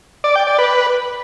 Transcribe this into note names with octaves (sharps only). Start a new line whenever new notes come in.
D5
G5
D5
B4